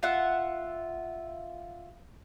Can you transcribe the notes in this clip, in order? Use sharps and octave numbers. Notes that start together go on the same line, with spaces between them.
F4 E5 F#5